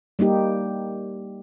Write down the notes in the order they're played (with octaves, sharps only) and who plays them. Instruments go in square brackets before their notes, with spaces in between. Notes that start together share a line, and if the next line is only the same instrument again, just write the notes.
[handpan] G3 A#3 D#4 G4